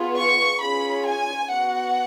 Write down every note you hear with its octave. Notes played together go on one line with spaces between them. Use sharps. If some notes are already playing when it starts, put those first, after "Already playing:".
Already playing: B3 F4 G#4
C#6
C#4 F4 G#4 B5
G#5
B3 F#4 F#5